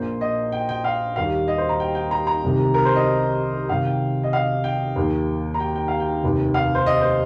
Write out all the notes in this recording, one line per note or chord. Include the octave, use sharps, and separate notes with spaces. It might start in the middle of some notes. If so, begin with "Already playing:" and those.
Already playing: A#1 A#2 A#3 C5
D#5
G5
G5
F5
D#2 D#3 G3 F5
D#5
C5
A#5
G5
G5
A#5
A#5
C2 C3 D#3
A#4
C5
D#5
C2 C3 D#3 F5
G5
D#5
F5
G5
D#2 D#3 A#3
A#5
G5
G5
F5
G5
F1 D#2 D#3
F5
C5
D#5
C5